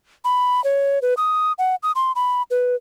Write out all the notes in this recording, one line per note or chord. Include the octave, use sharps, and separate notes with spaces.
B5
C#5
B4
D#6
F#5
D#6
C6
B5
B4